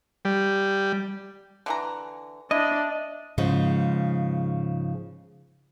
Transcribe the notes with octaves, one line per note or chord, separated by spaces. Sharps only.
G3
D3 E3 A#5
D4 E4 D#5
G#2 C#3 F3 G#3